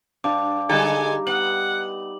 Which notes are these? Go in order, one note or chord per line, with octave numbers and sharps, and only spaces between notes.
G2 D4 F5 G5 D6
D3 G3 G#3 D#4 A4 G#5 A#5
B3 F#5 F#7